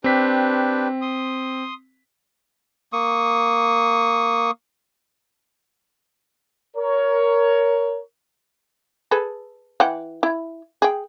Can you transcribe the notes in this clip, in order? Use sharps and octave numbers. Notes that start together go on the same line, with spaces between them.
C4 D4 G4 B4 B6
C6 D#6
A#3 C#6 D#6
A#4 C#5
G#4 A4 B4
E3 F#5 G5
E4
G#4 G5